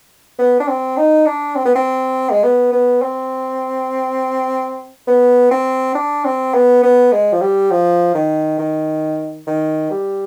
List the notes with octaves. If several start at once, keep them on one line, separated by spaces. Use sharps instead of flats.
B3
D4
C4
D#4
D4
C4
B3
C4
G#3
B3
B3
C4
B3
C4
D4
C4
B3
B3
G#3
F3
G3
F3
D#3
D#3
D#3
G3